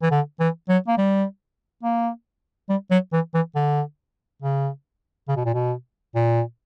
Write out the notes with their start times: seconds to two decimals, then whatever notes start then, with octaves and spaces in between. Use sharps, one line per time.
0.02 E3
0.11 D3
0.40 E3
0.68 F#3
0.88 A#3
0.98 G3
1.83 A#3
2.69 G3
2.91 F#3
3.13 E3
3.34 E3
3.55 D3
4.42 C#3
5.28 C#3
5.36 B2
5.45 A#2
5.54 B2
6.15 A#2